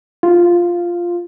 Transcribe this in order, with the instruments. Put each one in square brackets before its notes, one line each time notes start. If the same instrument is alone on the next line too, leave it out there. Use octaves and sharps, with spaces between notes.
[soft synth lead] F4